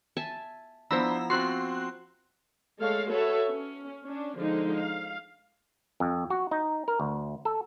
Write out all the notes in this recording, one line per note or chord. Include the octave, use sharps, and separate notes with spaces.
E5 G#5 A5
F3 B3 D4 E4 C5 A#5 B5 E6
C4 F4 F#4 C6 F#6
G#3 A3 A4 C#5 F5
F#4 A4 B4 C#5 E5
C#4
C#4 D4
D3 F3 G#3 D#4
F5
F2
F#4
D#4
A#4
D2
A4